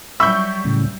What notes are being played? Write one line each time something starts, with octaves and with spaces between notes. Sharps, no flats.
F#3 G3 E5 B5 C#6 E6 G6
A2 C#3